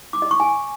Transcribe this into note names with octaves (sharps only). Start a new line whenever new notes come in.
D6
D#5
C#6
G#5